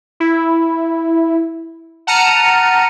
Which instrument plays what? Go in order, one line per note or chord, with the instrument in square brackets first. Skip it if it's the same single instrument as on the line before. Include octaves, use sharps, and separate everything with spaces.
[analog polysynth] E4
F#5 A5 A#5 F6 C#7 D#7